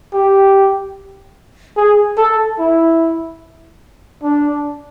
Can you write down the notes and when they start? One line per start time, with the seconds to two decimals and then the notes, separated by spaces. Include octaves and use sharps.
0.13 G4
1.76 G#4
2.17 A4
2.59 E4
4.23 D4